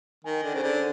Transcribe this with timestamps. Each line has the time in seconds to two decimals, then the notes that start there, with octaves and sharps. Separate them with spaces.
0.24 D#3 G#5
0.43 D3
0.54 C#3 C5
0.63 D3